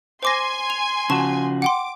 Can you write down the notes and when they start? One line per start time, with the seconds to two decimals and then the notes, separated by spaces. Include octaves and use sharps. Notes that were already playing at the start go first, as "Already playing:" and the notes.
0.23 C5 G#5 C6 D6 A#6
0.70 F7
1.10 C#3 F3 F#4 A5 C#6 E7
1.62 F#5 G5 C6 D6